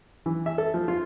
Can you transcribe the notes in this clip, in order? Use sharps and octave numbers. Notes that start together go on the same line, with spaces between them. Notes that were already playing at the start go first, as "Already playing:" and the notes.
E3
E5
A4
F3
F4